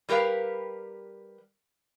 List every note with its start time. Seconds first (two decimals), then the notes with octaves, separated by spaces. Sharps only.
0.09 G3 G4 A#4 B4 F5